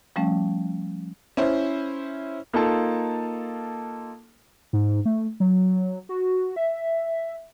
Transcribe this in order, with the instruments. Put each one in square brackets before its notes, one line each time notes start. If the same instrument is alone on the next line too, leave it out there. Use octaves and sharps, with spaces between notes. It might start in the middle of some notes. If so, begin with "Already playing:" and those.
[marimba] F3 G3 A3 C#4
[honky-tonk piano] C#4 E4 C5
[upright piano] A#3 D#4 F4 A4 A5
[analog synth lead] G#2
A3
F#3
F#4
E5